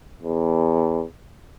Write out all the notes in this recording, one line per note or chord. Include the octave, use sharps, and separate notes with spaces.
E2